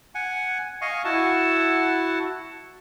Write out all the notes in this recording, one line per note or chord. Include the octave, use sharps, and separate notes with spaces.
F#5 G#5
D#5 F5 G#5 C#6
E4 F#4 F#5 A5